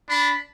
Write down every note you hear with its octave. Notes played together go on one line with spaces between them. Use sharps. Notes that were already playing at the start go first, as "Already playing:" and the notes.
D4 B5